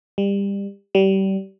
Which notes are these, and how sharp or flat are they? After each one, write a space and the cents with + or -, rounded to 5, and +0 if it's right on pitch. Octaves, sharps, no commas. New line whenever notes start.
G3 +25
G3 -25